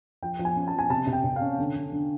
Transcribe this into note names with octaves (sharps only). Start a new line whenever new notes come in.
F3 G5
F3
G#5
C#4
A5
F3
G#5
C3 A5
C3
G5
C3
F5
C#4
D3
D3
D3